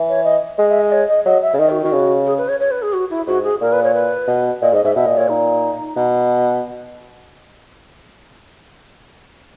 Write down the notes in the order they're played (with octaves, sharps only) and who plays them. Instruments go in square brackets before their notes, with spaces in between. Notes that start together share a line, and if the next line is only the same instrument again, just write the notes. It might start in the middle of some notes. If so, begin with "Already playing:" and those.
Already playing: [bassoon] E3
[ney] C#5
D#5
[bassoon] G#3 [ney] D#5
[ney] E5
D#5
C#5
D#5
[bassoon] F#3 [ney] D#5
[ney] E5
[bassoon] C#3
[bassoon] D#3 [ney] D#5
[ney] F#4
[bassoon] D#3 [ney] F#4
[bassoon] C#3
[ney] G#4
B4
C#5
C#5
B4
G#4
F#4
E4
[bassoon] G#2 [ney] F#4
[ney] G#4
[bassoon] A#2 [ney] A#4
[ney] B4
C#5
B4
[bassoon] B2
[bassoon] A#2 [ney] D#5
[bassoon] G#2 [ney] D#5
[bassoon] G#2 [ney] E5
[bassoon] B2 [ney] E5
[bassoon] A#2 [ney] D#5
[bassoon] A#2 [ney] C#5
[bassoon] A#2 [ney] D#4
[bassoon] B2